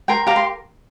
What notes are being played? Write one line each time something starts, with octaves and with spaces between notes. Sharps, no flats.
A#4 G5 C6
G4 F5 A#5
C6